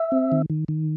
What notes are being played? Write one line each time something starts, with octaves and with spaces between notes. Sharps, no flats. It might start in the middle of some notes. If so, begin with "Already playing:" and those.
Already playing: E5
C4
D#3
D#3
D#3